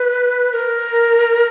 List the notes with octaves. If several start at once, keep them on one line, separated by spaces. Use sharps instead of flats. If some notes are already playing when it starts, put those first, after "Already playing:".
Already playing: B4
A#4